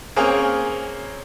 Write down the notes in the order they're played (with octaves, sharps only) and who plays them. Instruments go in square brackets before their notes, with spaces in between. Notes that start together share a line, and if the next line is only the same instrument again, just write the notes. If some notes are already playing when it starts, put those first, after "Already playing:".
[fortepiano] A#3 C4 C#4 G#4 A#4